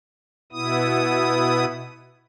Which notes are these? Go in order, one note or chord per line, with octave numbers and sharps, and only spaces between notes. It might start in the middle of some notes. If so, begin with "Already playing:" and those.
B2 B3 E4 D#6